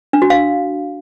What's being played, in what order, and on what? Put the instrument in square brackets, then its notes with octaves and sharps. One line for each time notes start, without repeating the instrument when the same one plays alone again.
[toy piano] D4
F#4
F5